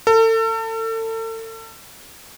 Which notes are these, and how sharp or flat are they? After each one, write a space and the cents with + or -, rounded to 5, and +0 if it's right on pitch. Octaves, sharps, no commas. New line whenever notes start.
A4 +35